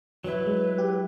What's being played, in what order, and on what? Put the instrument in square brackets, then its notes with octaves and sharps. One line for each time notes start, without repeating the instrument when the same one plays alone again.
[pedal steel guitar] F#3 E4 [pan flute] B4
[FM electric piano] G#3
G4